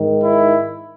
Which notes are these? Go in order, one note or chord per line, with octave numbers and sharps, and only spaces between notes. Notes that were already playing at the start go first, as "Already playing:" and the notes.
Already playing: G#2 D#3
E4